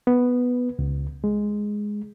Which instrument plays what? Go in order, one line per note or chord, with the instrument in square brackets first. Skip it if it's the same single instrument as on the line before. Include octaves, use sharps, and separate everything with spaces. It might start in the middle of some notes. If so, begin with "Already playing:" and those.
[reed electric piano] B3
C#2
G#3